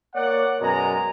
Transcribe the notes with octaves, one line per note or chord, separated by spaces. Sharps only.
A#3 C#5 D5 F#5
F#2 B2 G#3 D5 G#5 A#5